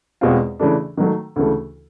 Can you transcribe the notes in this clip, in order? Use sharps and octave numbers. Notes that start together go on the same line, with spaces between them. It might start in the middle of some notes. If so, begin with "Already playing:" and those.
E2 B2 G#3 C4 F4
C#3 E3 A3 D4
D#3 F#3 A3
D2 C#3 E3 A3